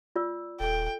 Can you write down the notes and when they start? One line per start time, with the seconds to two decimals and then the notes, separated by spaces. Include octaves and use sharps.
0.16 F4 D5 E6
0.60 D#1 A4 G5